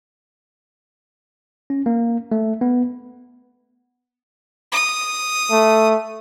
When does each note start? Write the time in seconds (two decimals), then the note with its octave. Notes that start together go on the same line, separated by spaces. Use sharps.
1.70 C#4
1.86 A#3
2.32 A3
2.61 B3
4.72 D#6
5.51 A3